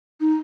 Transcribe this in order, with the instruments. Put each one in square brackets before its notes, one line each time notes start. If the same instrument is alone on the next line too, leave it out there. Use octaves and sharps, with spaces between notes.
[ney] D#4